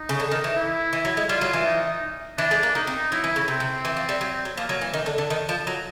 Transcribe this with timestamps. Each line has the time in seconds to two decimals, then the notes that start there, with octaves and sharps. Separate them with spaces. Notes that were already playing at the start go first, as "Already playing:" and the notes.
Already playing: D#4
0.09 C#3
0.20 D3
0.32 D#3
0.44 E3
0.57 E4
0.93 E3
1.05 F#3
1.17 G#3
1.29 G3 F4
1.41 F#3
1.53 E3
1.66 D#4
2.38 E3 D4
2.51 G#3
2.63 A#3
2.75 A#3 D#4
2.87 C4
3.12 F#3 E4
3.24 E3
3.36 C#3
3.48 C3 C4
3.60 C3
3.85 E3
3.97 F3
4.09 G3
4.21 F#3
4.45 F#3
4.57 F3 A#3
4.69 F#3
4.81 E3
4.94 D#3
5.06 D3
5.18 D3
5.30 D#3
5.49 F3
5.67 F#3